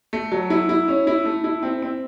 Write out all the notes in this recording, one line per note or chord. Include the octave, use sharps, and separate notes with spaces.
A3
F#3
E4
E4
C#4
E4
A3
E4
C4
C4